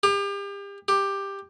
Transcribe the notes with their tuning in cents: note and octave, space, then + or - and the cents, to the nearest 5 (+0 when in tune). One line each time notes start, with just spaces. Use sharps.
G4 +35
G4 +10